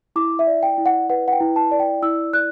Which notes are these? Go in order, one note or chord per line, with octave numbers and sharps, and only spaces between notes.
E4 D6
E5
D5
G5
E4
F#5
B4 F#5
F#5
G5
E4
A5
D5
G5
E4 E6
D5 F#6